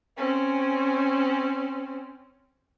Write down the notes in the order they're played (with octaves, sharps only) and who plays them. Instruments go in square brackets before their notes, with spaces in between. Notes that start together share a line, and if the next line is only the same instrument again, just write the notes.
[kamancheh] C4 C#4